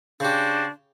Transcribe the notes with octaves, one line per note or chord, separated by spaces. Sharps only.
C#3 D4 F#4 G4 C5